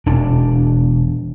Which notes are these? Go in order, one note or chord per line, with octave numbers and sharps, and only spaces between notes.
E1 D4